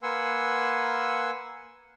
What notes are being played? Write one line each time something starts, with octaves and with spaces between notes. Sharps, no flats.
A#3 B4 F#5 G#5 C6 E6